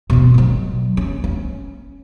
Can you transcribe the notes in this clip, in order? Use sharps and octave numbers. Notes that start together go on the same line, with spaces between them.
B2 C4
D#3 F#3
C#4
C#4